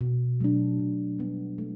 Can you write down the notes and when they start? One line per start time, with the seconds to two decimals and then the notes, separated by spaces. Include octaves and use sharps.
0.01 B2
0.40 F#3 A3 D4
0.79 B2
1.19 G3 B3
1.58 A3